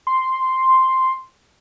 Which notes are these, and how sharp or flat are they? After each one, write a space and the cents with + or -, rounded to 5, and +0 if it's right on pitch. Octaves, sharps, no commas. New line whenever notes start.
C6 +0